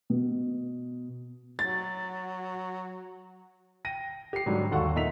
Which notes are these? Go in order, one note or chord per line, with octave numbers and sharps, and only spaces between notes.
B2
F#3 A6
G5 A#6 D#7
G4 C7
G#2 D3 F#3 G3
D#2 A4 F5 F#5 C6 C#6
A#2 D#4 E5 B6 F7